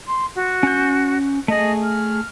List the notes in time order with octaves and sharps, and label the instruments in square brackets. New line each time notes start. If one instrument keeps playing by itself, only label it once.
[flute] C6
F#4
[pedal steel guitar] C#4 G6
[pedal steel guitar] A3 G#4 [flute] D#5
[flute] F6